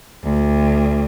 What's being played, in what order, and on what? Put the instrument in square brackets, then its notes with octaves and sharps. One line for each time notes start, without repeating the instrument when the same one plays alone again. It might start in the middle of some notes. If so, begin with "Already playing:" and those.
[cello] D2